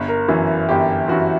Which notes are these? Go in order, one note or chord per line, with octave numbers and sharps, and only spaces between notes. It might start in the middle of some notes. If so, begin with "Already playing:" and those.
Already playing: G1
A#4
F#2 E3
G1 G4
F#2 E3 F#4